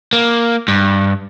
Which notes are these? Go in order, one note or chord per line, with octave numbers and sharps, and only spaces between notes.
A#3
G2